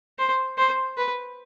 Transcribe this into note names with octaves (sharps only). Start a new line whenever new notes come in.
C5
C5
B4